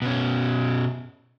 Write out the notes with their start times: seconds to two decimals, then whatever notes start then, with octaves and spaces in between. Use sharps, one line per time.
0.02 B2 C#4